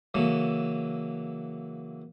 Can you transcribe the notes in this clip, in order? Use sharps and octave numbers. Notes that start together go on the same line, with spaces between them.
C#3 E3 F#3 A#3 A4